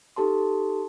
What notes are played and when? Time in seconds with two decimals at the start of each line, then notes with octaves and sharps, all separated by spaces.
0.16 D#4 G4 A4 A5 C6